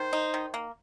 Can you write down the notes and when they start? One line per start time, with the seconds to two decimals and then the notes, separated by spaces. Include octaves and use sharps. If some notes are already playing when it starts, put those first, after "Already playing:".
Already playing: D#3 C5
0.13 D#4
0.34 D#3
0.54 A#3